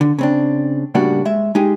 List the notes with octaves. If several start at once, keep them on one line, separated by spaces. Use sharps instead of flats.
D3
C#3 C4 D4
A2 C#3 G3 A#3 D4 F#4
G#3 E5
G#3 D#4 G4 G#4